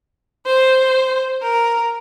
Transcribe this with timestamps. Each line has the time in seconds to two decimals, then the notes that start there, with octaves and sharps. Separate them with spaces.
0.46 C5
1.42 A#4